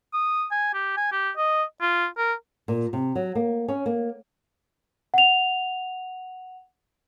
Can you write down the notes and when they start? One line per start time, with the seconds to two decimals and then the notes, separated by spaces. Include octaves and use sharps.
0.13 D#6
0.51 G#5
0.74 G4
0.97 G#5
1.12 G4
1.37 D#5
1.81 F4
2.17 A#4
2.68 A#2
2.93 C3
3.15 F#3
3.35 A#3
3.68 C#4
3.86 A#3
5.14 F#5 F7